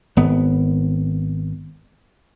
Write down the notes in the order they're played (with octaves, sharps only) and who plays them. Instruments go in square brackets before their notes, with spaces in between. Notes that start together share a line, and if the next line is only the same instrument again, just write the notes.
[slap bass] G#1 B3